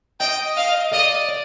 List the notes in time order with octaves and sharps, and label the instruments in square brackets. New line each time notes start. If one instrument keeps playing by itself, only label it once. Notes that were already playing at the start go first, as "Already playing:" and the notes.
[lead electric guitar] D#5 [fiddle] G5
[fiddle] F5
[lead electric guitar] D5 [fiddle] D#5
[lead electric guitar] D5